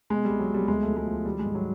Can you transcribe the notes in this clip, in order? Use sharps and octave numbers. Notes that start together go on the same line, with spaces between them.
B2 G#3
C2 G3
F#3
B2 G3
D2 G#3
F3 A3
G#3
F3
D#3 G3
G#3
G#2
F#3